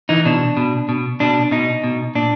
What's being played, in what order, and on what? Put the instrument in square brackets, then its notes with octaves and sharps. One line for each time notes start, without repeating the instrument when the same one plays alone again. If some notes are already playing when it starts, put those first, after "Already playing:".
[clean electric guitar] E3 D#4
B2 D4
B2
B2
B2 D4
B2 D#4
B2
A#2 D4